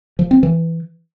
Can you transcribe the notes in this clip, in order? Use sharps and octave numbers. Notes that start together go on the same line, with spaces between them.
F3
C4
E3